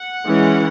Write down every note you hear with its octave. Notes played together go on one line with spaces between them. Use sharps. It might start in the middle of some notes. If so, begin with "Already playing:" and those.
Already playing: F#5
E3 G#3 C#4